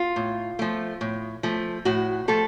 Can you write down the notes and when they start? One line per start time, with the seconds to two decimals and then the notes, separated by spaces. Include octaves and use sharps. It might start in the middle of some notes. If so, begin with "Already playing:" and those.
Already playing: F4
0.16 A2
0.59 F3 A3
1.01 A2
1.43 F3 A3
1.85 A2 F#4
2.28 F3 A3 A4